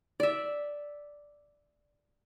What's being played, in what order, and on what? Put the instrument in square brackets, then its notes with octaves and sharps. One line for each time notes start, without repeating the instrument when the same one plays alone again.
[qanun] D5 E5